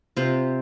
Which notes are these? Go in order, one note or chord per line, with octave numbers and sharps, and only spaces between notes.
C3 F4